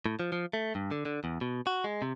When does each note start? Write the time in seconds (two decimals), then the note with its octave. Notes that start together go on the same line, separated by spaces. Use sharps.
0.06 A2
0.20 F3
0.32 F3
0.53 A3
0.75 G2
0.91 D3
1.05 D3
1.24 E2
1.41 B2
1.67 F#4
1.84 G#3
2.02 C3